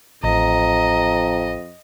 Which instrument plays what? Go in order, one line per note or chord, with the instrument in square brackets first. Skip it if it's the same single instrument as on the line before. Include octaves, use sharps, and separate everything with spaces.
[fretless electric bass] A1 [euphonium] F2 [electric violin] D#5 [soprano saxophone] A#5